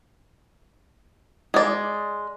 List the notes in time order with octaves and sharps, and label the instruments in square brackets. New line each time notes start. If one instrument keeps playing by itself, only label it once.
[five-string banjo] G#3 D5